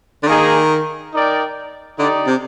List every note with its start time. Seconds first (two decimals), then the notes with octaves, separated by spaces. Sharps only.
0.23 D3
0.27 D#3 A#3 D#4 G#4 D#5
1.13 D#4 A#4 D5 G5
1.99 D3 D#4 G4 D5
2.27 C3